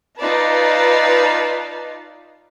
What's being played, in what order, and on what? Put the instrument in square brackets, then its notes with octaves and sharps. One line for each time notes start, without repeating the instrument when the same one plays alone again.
[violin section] D#4 F4 B4 D5 A5